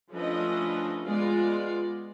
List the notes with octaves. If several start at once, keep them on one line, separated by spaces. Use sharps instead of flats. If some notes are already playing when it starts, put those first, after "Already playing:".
F3 A3 C#4 D4 B4 D#5
G#3 B3 F4 D5